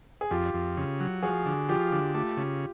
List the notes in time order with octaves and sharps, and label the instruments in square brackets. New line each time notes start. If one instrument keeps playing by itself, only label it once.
[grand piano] G#4
[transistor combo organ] F2 [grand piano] F4 G4
[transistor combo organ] F2
C#3
F#3
[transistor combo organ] F3 [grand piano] F#4 G#4
[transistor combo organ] D3
[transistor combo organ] F3 [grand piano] F4 G4
[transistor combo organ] D3
[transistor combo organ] A3 [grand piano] F4 G4
[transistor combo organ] C#3